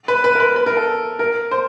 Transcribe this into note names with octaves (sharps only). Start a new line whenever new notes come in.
B4
B4
A#4
B4
B4
A#4
A4
A#4
C5